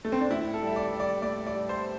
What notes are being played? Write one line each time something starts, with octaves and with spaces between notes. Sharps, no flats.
A3
C4
D4
A2 E4
A4
G3
E5
D5
G3
D5
A2 D5
D5
G3
C5